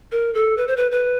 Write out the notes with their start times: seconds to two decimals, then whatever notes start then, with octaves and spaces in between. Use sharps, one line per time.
0.12 A#4
0.34 A4
0.57 B4
0.68 C5
0.76 B4
0.92 B4